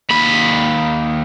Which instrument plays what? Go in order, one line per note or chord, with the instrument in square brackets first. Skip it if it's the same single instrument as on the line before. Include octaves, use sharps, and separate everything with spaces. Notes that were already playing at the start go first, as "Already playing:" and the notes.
[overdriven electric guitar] D#2 B5